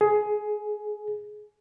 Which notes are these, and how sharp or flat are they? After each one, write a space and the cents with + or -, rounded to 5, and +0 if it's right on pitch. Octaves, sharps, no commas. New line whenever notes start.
G#4 +15